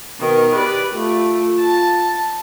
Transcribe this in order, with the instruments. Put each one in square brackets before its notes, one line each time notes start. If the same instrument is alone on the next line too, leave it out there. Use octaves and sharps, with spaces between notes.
[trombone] B2 [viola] D#3
[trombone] G4 [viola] B4 D5
[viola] A3 [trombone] F4
[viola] A5